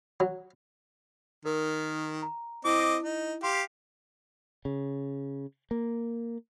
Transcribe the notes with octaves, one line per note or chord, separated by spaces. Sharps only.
F#3
D#3 A#4
A#5
C4 E4 D#5 D6
D#4
G4 F5 C6
C#3
A#3